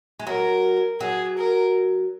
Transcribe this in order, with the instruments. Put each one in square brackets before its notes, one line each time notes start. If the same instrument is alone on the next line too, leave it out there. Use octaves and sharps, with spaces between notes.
[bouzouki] G#3
[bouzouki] F#3 [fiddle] A#4
[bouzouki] F#3 [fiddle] G#4
[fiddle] A#4